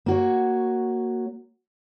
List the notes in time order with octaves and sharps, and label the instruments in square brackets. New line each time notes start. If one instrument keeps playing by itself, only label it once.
[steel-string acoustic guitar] A#3 F#4 C#5